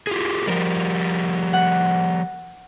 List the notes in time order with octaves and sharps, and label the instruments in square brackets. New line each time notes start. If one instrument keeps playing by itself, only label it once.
[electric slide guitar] F4 G4 G#4
[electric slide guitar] F3 G3 [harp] A#4
[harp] F#5